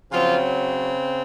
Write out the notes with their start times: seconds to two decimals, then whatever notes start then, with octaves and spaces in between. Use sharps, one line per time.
0.11 C#3 F3 F#3 C4 F4